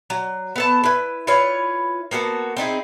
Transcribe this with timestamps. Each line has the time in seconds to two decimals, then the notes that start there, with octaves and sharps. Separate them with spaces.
0.10 F#3
0.56 B3 A4 A5
0.84 E4 B4
1.27 E4 F4 B4 C#5
2.11 A#3 B3 F#4 A4
2.57 C4 D#4 E4 G#4